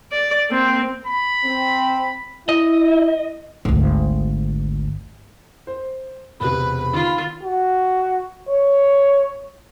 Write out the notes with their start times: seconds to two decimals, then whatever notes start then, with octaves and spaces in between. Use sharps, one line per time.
0.12 D5
0.49 A#3 C4
1.07 B5
1.44 C4
2.49 E4 D#5
3.65 G#1 D2
5.67 C5
6.40 E1 C3 B4 B5
6.93 D#3 F4
7.43 F#4
8.48 C#5